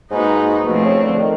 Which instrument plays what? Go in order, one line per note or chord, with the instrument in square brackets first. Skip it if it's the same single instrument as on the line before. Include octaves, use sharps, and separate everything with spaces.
[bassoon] G#2 [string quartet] A#3 D#4 F#4 B4
[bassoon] B2 [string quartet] F3 A3 C4
[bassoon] C#3
D3
D#3